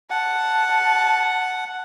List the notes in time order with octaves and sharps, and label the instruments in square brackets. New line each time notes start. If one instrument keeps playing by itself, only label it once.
[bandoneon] F#5 [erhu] A5